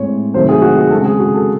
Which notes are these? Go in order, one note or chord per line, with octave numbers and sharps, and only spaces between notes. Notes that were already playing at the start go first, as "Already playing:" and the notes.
Already playing: A2 G#3 C4 C#5
C3 D#3 F#3 A3 C5
G#4
F#4
G#4
C#3 G#3 C4 A4
G#4
F#4
A4